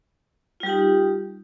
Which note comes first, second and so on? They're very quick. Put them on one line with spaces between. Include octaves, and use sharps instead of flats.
F4 G3 G4 D#4